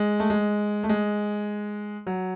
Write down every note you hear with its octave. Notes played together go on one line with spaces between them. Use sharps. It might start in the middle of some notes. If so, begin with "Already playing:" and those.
Already playing: G#3
A3
G#3
A3
G#3
F#3